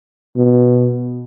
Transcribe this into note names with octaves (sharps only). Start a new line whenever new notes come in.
B2